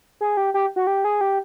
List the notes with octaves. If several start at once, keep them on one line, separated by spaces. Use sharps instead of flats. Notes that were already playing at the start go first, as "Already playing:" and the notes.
G#4
G4
G4
F#4
G4
G#4
G4